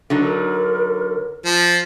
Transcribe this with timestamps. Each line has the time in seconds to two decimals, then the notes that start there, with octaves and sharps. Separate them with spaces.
0.10 D3 F#3 D#4 A#4
1.45 F3